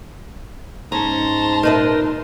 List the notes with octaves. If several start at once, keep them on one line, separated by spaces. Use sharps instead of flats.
G#2 C#4 A5 A#5 C6
A#2 D#4 A#4 B4 E5